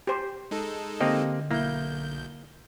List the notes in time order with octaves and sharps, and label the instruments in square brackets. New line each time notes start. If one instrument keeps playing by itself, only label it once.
[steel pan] G4 C5
[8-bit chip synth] G#3 D#4 A4
[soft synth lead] D3 [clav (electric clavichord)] A#3 C4 G4 [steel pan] D#5
[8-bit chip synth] B1 G6 [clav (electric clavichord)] A#3 [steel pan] E4